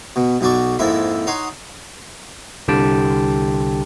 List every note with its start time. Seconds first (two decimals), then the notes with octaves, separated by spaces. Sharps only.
0.16 B2
0.41 B1 B2 F#4 D5 C#6
0.79 F2 G#2 A#3 E4 E5
1.27 D#4 C#5 F#5 C6
2.68 C2 D3 G4 G5 A5